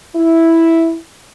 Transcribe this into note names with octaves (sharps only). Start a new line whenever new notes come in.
E4